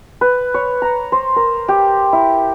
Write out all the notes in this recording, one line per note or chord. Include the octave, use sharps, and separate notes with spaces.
B4
C#5
A#5
C5
A#4
G4
E4